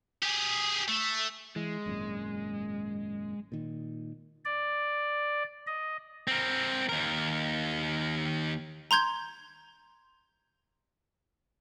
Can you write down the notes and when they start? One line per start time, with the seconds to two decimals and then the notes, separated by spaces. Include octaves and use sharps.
0.23 G4 G#4
0.88 A3
1.56 E3 G#3
1.86 G#1 F#2 A#2
3.52 A#2 D#3
4.45 D5
5.67 D#5
6.28 C4 A#4
6.89 D#2 A#4
8.91 A#5 C6 G6 G#6